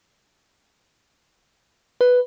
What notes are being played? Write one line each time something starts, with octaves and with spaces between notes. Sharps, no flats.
B4